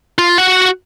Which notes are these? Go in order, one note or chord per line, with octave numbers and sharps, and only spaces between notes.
F4
F#4 F#5